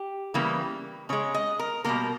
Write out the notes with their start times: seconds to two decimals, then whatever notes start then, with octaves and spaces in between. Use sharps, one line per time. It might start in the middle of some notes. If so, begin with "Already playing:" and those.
Already playing: G4
0.34 C#3 E3 G3 A#3
1.09 C#3 G#3 C#5
1.34 D#5
1.59 A#4
1.84 B2 G3 A#3 A#4